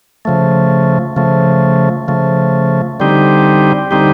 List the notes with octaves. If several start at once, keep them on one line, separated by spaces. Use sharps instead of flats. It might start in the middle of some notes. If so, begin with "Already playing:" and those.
C#3 F3 A3
C#3 F3 A3
C#3 F3 A3
D3 G3 C4 D#4 G4
D3 G3 C4 D#4 G4